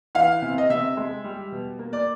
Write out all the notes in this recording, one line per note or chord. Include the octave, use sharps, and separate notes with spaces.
E3 F5
C3
D#5
C3 E5
G#3
G3
B2
A#3
D5